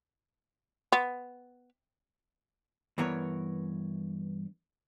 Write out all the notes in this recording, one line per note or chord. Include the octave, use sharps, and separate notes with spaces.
B3
G2 E3 B3 A#4 C#5